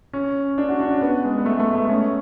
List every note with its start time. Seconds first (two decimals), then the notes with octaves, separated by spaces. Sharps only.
0.13 C#4
0.58 D4
0.69 F#4
0.80 D4
0.90 C#4
1.01 B3
1.24 G#3
1.38 B3
1.46 A3
1.60 A3
1.75 A3
1.89 C#4